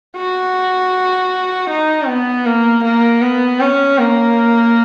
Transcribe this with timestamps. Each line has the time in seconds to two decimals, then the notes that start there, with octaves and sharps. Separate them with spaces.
0.17 F#4
1.70 D#4
2.07 B3
2.46 A#3
2.84 A#3
3.22 B3
3.61 C#4
3.99 A#3